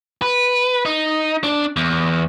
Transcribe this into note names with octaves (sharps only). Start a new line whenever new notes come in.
B4
D#4
D4
E2